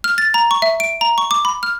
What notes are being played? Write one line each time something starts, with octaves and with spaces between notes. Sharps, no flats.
F6
A6
A#5
C#6
E5
D7
A#5
C#6
D6
B5
F6